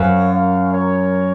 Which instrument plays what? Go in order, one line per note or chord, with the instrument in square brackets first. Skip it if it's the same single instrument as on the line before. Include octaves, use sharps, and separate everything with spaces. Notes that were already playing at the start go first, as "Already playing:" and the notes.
Already playing: [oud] F#2 [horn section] C#5 F5
[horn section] C#5 F5
A#4 C#5